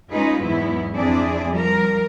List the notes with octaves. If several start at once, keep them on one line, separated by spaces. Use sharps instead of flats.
G#3 C#4 D#4 F4 G#4 B4
E2 G#2 F#3 B3 E4
F2 C4 D4 E4 G#4 D5
F3 G3 A#4